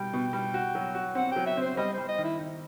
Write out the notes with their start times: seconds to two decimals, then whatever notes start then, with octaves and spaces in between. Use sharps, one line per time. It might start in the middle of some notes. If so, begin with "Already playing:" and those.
Already playing: B2 G3 G5
0.13 B2
0.33 G3
0.54 F#4
0.75 F#3
0.95 F#4
1.15 C4 F#5
1.32 F#3 G5
1.46 E5
1.57 C4 C5
1.77 G3 D#5
1.93 G3 C5
2.08 D#5
2.18 D#3
2.24 E4
2.39 D#4